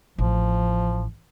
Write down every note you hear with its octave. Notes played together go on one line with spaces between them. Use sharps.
A1 F3